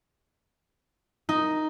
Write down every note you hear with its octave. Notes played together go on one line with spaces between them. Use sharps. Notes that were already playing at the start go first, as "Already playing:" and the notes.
D#4